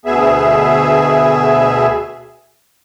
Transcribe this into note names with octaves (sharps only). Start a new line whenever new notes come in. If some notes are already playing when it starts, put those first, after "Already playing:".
D2 B2 B3 G#4 E5